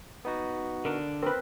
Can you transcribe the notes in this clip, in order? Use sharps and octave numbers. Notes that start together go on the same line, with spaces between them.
B3 D#4 F#4
D3 D4 A#4
C4 A#4 B4